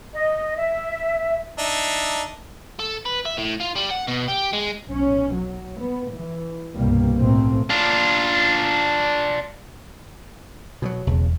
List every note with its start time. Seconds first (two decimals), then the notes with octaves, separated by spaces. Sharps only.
0.14 D#5
0.57 E5
1.58 D4 D#4 E5
2.79 A4
3.06 B4
3.26 E5
3.38 A2
3.61 F4
3.76 G3
3.91 F#5
4.08 B2
4.28 G4
4.53 G#3
4.88 B1 C#4
5.32 F#3
5.79 B3
6.12 E3
6.75 C2 G2 B2 G3 A#3
7.19 A1 B2 A3 A#3 C4
7.70 D4 F4
10.82 B2 F3 F#3
11.07 E1 B1 C#3